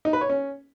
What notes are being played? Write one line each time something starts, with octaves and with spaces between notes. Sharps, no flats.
D#4
B4
C#5
C#4